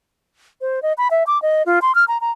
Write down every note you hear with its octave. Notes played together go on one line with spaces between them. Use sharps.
C5
D#5
B5
E5
D6
D#5
F4
C6
F6
A#5
A#5